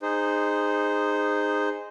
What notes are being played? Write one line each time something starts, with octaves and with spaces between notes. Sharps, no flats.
D#4 G#4 C5